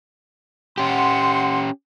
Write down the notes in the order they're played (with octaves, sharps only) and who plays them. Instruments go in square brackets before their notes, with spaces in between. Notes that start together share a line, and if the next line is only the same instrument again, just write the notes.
[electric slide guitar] C#4 G4 [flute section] F#5 C6